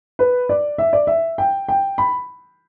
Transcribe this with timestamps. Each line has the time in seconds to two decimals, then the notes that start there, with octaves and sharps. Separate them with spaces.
0.19 B4
0.49 D5
0.78 E5
0.93 D5
1.07 E5
1.38 G5
1.69 G5
1.98 B5